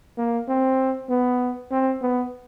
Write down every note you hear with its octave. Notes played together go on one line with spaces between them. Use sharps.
A#3
C4
B3
C4
B3